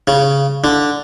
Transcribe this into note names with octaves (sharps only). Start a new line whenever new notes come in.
C#3
D3